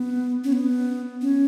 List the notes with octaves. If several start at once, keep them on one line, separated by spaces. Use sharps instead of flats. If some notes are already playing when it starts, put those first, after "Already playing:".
Already playing: B3
C#4
B3
C#4